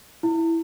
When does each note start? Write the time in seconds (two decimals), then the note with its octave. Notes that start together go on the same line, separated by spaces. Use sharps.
0.23 E4